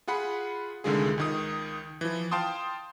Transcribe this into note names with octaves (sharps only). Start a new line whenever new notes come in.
F4 G#4 F#5 B5
C2 D3 D#3 G#3 F4 G#4
C#2 D#3 D#6
E3 F3
F5 G5 A5 C6 D#6